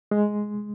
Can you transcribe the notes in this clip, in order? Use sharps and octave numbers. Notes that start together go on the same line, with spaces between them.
G#3